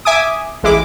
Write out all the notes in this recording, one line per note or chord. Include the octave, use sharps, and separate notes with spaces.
E5 G#5 D6 D#6
A1 G#3 E4 D6